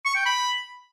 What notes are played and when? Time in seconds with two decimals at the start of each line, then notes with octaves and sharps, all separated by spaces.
0.05 C#6
0.15 G5
0.26 B5